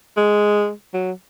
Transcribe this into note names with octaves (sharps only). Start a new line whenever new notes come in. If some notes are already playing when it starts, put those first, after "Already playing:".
G#3
F#3